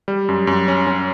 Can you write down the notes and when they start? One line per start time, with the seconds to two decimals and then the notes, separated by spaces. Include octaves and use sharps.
0.08 G3
0.29 F#2
0.47 F#2
0.68 C#4
0.87 C#4